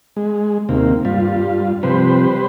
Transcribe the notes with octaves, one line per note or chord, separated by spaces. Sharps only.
G#3
D#2 C3 A#3
G2 G3 F4
C3 F3 G3 B4 C5